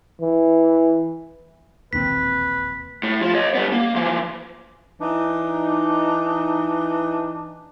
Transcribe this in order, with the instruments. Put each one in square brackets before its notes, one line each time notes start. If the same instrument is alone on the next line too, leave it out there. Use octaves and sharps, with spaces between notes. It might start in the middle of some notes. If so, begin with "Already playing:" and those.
[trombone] E3
[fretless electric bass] E1 A#1 D#2 [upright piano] A#2 C4 [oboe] B4 [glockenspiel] B6
[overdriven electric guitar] A2
F3
C#5 D#5
G3 B3
A#3
E3 F3
[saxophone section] E3 D4 D#4